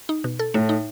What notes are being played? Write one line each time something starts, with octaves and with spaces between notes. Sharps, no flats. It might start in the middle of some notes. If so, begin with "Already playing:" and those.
D#4
B2
A4
A2 A3
D#4